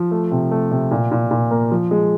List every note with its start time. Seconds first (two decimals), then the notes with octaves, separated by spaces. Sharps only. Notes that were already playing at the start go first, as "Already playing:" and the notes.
Already playing: F3
0.11 A3
0.31 C3
0.51 A3
0.71 C3
0.91 A#2
1.12 A#2
1.31 A#2
1.51 A#3
1.71 F3
1.91 G#3